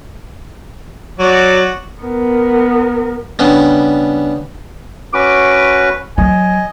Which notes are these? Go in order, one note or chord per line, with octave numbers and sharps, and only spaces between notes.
F#3 F#4 D5
B3 A#4
C#3 G3 B3 D4 G4
C#4 F#4 B4 D6
F#3 D#5 G#5